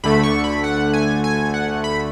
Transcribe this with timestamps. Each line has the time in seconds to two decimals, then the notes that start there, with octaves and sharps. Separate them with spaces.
0.04 D2 D3 A3 B5
0.23 C#6
0.44 B5
0.64 F#5
0.93 G#5
1.24 G#5
1.54 F#5
1.84 B5